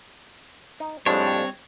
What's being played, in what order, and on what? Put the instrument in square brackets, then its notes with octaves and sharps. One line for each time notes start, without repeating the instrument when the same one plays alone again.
[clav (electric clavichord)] D#4
[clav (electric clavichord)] F2 A2 G#3 [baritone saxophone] G3 [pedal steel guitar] C4 C#5 [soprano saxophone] D4